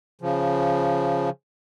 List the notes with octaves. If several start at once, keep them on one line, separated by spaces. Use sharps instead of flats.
C#3 F3